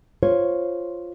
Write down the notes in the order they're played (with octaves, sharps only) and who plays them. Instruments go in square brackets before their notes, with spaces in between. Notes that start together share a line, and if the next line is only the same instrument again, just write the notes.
[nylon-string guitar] F4 C5 C#5